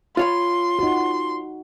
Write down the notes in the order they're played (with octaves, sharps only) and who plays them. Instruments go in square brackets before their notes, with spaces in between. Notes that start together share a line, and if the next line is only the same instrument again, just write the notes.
[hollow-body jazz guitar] F4 C#5 B5 [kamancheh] C6
[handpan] D#4 F#4